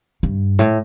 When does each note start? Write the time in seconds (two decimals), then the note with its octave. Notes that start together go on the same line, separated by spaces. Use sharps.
0.23 G2
0.59 A2